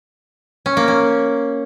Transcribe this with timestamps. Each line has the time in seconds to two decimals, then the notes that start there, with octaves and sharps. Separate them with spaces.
0.66 C#4
0.77 A#3
0.88 C#4